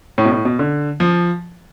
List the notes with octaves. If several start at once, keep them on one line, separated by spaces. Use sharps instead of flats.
A2
B2
A2
B2
D3
F3